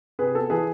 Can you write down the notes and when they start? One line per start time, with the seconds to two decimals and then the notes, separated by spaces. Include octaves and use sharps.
0.19 C3 G#4 B4
0.34 B3 A4
0.50 E3 G#4 B4